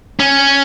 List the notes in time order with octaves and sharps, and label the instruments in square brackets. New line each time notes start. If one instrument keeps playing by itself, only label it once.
[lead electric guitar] C#4